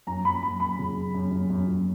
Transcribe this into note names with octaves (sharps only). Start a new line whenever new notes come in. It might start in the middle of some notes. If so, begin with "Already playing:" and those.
F#2 A#5
F#2 B5
F#2 B5
F#2 B5
C#3
F#2
F#2
F#2
F#2
F#2